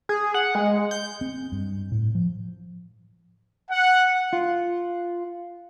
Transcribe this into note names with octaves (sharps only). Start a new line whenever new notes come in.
G#4
F#5
G#3
G6
C4
G2
A2
F3
F#5
F4